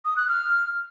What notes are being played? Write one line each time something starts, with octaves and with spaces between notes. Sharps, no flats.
D#6
F#6
F6